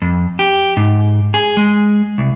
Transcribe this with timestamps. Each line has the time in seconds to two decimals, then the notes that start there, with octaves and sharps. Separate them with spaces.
0.02 F2
0.39 G4
0.77 G#2
1.34 G#4
1.57 G#3
2.18 C2